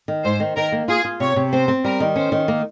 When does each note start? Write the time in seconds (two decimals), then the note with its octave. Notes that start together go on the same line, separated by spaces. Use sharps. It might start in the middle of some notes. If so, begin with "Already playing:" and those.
0.08 D#3
0.24 G#2 C5
0.40 D#3
0.56 D#3 A#4
0.72 A#3
0.88 F4 G#4
1.05 F4
1.20 C3 C#5
1.36 C3
1.52 C4 C5
1.68 C4
1.84 G3 A#4
2.00 D#3
2.16 C#4 C5
2.32 D#3
2.48 A#3